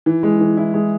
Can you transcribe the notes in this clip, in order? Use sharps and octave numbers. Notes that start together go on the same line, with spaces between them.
E3
G#3
E3
E4
G#3